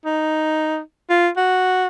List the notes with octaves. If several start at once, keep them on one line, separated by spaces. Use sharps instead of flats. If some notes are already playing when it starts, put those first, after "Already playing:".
D#4
F4
F#4